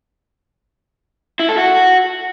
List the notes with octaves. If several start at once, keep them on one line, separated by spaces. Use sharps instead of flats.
E4
A4
F#4